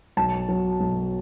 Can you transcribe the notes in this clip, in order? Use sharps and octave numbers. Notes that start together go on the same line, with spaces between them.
B1 A5
F#3
B1